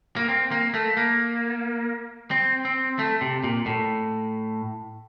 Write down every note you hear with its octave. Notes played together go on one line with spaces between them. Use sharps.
A#3
C4
A#3
A3
A#3
C4
C4
A3
C3
A#2
A2